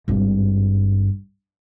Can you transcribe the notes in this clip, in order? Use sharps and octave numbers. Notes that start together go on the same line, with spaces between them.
G#1 G2